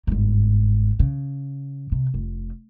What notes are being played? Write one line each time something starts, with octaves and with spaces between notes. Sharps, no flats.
G1 G#2
C#3
C3
F1